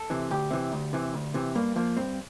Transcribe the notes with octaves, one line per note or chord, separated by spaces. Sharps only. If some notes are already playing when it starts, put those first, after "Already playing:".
Already playing: A4
C3 E3
D2 G4
C3 E3
D2
C3 E3
D2
C3 E3
G2 A#3
F3 A#3
G2 C4